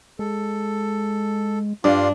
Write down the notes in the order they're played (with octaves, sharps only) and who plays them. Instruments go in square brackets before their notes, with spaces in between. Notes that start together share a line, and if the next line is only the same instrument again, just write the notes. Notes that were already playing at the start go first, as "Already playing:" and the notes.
[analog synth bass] G#3 [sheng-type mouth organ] A4
[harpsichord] G2 [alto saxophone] D4 [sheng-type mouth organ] F4 C6